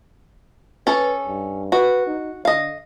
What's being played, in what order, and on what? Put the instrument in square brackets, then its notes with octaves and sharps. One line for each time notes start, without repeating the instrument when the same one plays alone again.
[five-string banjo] C#4 A4 [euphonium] B4
[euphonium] G2
[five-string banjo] F#4 [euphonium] B4
[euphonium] D#4
[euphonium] D3 [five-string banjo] D#5 F5